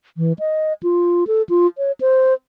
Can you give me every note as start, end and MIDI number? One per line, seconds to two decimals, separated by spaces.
0.17 0.33 52
0.39 0.73 75
0.83 1.24 65
1.27 1.42 69
1.49 1.67 65
1.78 1.92 73
2.01 2.34 72